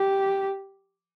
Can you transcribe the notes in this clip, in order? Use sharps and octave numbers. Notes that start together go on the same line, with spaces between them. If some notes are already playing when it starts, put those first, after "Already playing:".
Already playing: G4